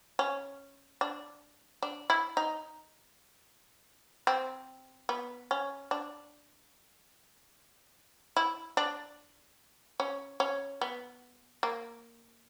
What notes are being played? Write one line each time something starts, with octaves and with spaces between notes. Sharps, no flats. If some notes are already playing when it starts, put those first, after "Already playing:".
C#4
D4
D4
E4
D#4
C4
B3
C#4
D4
E4
D4
C#4
C#4
B3
A#3